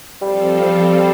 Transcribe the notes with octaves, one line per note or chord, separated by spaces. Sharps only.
F3 G3 C4 F4 A4